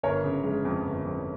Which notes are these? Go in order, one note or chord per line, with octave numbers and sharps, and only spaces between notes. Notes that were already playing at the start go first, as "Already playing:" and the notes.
G1 A#4 C#5
C#3
G#3
F2
G1
F2